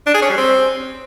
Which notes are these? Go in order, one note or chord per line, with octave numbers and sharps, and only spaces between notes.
D4
G#4
C#4
G3
C4